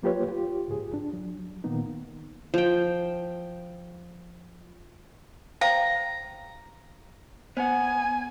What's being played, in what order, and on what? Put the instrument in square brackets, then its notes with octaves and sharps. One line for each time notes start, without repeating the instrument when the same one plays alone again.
[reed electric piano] F#3 A#3 F4 G4 B4 C#5
F4 G4
C#2 G#2 G#4
D4
F#3
A#2 D#3 A#3 B3 D#4
[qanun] F3 G5
[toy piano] C5 F5 G5 [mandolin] A#5
[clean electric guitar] B3 F#5 [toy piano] C5 [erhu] G#5